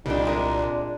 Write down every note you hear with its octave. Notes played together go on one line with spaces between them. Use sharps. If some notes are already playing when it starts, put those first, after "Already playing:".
C2 A#2 D3 G3 D4 D#4 G5
C3 G#3 D4 A#4